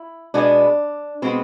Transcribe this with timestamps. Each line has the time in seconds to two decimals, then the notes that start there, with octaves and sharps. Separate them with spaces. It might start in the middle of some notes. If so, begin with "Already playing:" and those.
Already playing: E4
0.34 B2 G#3 B3 D4
1.22 B2 G#3 B3 C4